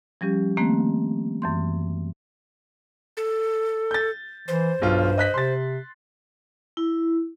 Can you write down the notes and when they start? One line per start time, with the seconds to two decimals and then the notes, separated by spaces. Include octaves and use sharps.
0.21 F3 G3 C#4 G4
0.57 D#3 F3 A3 A#3 C4
1.42 F#2 E3 C6
3.17 A4
3.91 G6 A6
4.48 E3 C5
4.82 B1 G2 F4
5.18 D#5 F#6 B6
5.34 C3 C6 A6
6.77 E4